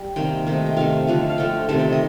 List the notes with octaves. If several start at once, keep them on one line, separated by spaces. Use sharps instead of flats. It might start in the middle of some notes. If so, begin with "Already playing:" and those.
Already playing: G3
C3 D#3 A#3 G5
C3 D#3 A3
G5
C3 D#3 A3 F5
D3 F3 A3
F5
D3 F3 A3 G5
C3 D#3 A3 A5
G5
D#5